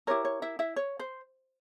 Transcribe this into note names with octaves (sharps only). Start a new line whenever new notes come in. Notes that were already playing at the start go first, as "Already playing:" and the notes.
E4 G4 A#4 C#5
C#5
E4 E5
E4 E5
C#5
C5